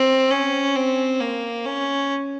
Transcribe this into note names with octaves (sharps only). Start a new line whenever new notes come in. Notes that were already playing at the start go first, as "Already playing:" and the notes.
Already playing: C4
C#4
C4
A#3
C#4